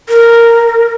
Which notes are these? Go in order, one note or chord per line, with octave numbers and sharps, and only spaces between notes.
A#4